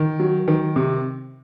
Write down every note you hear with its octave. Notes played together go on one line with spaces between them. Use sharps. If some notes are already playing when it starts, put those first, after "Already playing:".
Already playing: D#3
F#3
D#3
C3